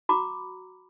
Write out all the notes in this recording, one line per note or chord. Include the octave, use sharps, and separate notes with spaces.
F#4 A#5 B5 D6